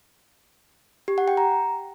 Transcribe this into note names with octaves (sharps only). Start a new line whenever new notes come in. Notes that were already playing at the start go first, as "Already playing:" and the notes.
G4
F#5
G5
A#5